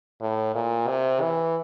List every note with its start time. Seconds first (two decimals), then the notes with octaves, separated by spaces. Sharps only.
0.21 A2
0.55 A#2
0.88 C3
1.21 E3